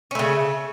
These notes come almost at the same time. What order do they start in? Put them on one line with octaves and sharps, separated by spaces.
C#4 A3 C#3